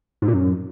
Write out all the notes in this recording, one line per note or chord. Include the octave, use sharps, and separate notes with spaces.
G#2
A#2
F#2